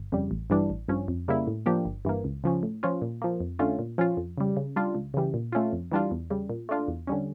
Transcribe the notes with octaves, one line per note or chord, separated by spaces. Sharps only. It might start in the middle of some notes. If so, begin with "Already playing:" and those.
Already playing: G1
F2 C#3 G3
A1
G2 E3 G3 D4
A1
G2 F3 C#4
F2
C#3 G3 A#3 E4
A2
F3 A#3 D4 G4
G1
G2 E3 A#3
C#2
C#3 F3 C#4
A2
F3 C#4 F4
A#2
F3 A#3
F2
D3 A3 C#4 F4
A#2
F3 C#4 F4
F2
C#3 G3
C#3
G3 D4 F4
C#2
C#3 E3 G3
A#2
A3 C#4 F4
F2
E3 G3 D4 F4
E2
C#3 G3
A#2
A3 D4 F4
E2
D3 G3 C#4